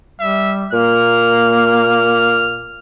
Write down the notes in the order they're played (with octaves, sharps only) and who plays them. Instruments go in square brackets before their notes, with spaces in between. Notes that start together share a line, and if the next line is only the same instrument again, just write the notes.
[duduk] G3 [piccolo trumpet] E5
[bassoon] A#2 [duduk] A#3 [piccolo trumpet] F6